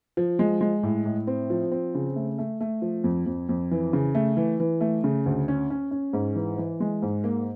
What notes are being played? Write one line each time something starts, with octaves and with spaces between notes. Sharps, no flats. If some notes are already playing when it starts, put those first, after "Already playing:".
F3
G#3
G#3
A2
A2
C4
F3
C4
C#3
A3
A3
A3
F3
F2
F2
F2
E3
C#3
A3
E3
E3
A3
C#3
D2
C#4
C#4
C#4
G#2
E3
E3
G#3
G#2
A#3